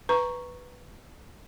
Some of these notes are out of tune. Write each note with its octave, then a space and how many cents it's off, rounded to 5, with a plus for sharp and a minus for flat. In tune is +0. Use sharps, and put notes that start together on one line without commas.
B4 +0 A#5 +0 C#6 +0